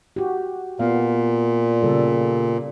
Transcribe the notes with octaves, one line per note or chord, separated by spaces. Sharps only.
F#4 G4
A#2 B3 F5
C#3 G3 A4